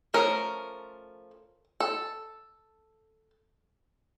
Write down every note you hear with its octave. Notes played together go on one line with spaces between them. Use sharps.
F3 A3 C#4 A#4
A4